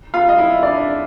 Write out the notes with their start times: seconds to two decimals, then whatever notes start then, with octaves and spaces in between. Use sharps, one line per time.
0.14 F4 F5
0.29 D#5
0.38 E4 E5
0.63 D4 D5